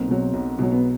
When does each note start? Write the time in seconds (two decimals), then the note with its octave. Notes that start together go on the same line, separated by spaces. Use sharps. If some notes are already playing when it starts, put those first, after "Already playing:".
Already playing: B1 A#3 C4
0.08 B2 F#3
0.33 B1
0.59 B2 F#3
0.72 B3